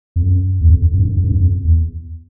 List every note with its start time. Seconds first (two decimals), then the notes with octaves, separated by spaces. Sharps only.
0.16 F2
0.23 F#2
0.61 E2
0.70 F2
0.82 F2
0.93 F#2
0.99 G2
1.05 F#2
1.17 F#2
1.24 G2
1.32 F#2
1.40 F2
1.65 E2